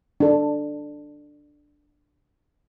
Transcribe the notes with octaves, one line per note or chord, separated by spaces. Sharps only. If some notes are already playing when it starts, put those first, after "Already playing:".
D4 A4